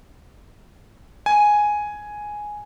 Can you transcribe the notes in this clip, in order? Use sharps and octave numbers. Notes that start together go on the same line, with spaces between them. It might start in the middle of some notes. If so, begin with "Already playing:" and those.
G#5